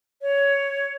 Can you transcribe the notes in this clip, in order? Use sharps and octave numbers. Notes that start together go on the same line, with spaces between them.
C#5